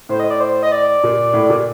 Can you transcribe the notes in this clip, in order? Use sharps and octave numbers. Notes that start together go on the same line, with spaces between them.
A2 C5
D#5
D5
C5
D#5
D5
A#2
A2
A#2